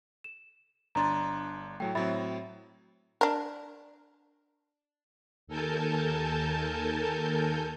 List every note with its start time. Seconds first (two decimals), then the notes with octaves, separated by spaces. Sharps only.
0.24 E7
0.95 G1 D4 A#5 C6 A6
1.80 A2 F#3 A3 E4 G5
1.95 A2 F#3 C4 E5 B5 A6
3.21 D4 A#4
5.47 D#2 A4 A#4 G#5 A5 G6